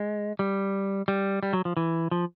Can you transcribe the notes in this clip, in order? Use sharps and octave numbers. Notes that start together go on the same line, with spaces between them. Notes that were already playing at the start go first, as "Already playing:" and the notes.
Already playing: G#3
G3
G3
G3
F#3
F3
E3
F3